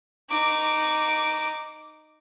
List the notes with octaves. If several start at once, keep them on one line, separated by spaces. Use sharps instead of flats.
D#4 D6